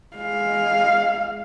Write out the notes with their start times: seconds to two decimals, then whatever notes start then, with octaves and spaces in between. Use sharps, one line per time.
0.17 G#3 F5